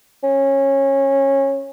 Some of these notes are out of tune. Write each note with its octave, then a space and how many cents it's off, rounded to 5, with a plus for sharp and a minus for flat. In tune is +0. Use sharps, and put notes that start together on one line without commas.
C#4 -20